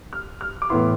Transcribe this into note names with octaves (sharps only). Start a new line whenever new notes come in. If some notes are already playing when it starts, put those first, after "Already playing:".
F6
F6
D6
A2 E3 B3 E4 C6